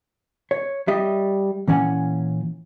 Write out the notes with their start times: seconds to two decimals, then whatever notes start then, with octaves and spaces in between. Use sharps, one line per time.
0.51 C#5
0.88 G3 D#5 E5
1.68 A#2 E3 C#4 F#5 G#5